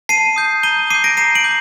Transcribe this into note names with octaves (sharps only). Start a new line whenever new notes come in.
A5 C7 D#7
D#6 G6
A#5 D#7 G7
D6 G6 C7 D#7
A#6 D7
A#5 C7 D#7
D7 F#7
D6 G6